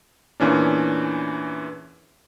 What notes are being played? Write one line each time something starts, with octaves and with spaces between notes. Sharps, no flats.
E2 A#2 E3 C#4 D4